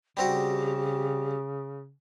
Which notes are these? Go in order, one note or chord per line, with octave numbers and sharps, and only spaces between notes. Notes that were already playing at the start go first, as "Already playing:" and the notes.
C#3 G3 C4 F#4 G4